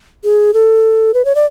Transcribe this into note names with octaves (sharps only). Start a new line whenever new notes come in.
G#4
A4
B4
C#5
D5